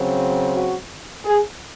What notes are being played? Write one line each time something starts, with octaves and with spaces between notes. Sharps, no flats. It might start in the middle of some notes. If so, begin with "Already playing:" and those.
Already playing: C#3 F#3 C4
F#4
G#4